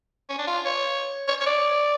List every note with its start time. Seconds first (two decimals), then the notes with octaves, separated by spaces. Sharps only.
0.29 C#4
0.38 D4
0.47 F4
0.65 C#5
1.28 C#5
1.41 C#5
1.46 D5